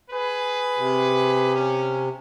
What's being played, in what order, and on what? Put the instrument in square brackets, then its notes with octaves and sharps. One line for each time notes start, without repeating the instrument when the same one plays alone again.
[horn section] G#4 B4
[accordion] C3
[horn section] C#4